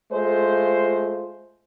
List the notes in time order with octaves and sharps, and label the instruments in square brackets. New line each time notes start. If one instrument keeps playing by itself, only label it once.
[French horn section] G#3 A3 F4 C5